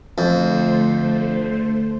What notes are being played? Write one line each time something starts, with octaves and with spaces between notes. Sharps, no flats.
F2 D3 A3 C5